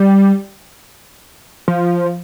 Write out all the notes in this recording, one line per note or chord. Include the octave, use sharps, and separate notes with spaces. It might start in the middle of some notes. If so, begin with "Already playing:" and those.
Already playing: G3
F3